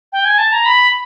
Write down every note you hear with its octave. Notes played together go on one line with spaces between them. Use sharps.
G5
G#5
A5
A#5
B5